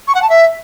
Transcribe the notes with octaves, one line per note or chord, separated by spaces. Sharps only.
C#6
F#5
A5
E5